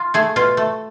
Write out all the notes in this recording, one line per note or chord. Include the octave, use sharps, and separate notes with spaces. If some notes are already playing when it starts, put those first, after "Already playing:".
Already playing: F4
A3 G#4
B2 F4
A3